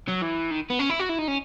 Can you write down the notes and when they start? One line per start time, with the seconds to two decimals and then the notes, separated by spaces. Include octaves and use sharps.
0.08 F#3
0.22 E3
0.51 D#3
0.70 B3
0.79 C#4
0.90 E4
1.00 F#4
1.09 E4
1.19 D#4
1.28 C#4